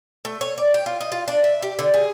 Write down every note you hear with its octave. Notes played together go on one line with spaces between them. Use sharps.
A3
C#5
D5
G5
F4
D#5
F4
D4
E5
G4
D3
G#4